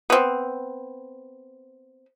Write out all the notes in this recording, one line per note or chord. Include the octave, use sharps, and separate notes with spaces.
B3 C4